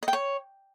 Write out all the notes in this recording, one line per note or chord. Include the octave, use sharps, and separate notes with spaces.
D#5
G5
C#5